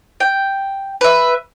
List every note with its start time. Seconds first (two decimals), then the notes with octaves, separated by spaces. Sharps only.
0.20 G5
1.01 B4 E5